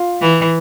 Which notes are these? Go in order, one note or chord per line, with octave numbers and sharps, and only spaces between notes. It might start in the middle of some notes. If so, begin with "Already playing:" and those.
Already playing: F4
E3